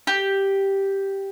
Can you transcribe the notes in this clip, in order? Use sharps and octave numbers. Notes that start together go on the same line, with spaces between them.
G4